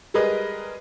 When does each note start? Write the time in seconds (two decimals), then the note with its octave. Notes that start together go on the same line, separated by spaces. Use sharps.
0.14 G3 G#3 G#4 A#4 B4 D#5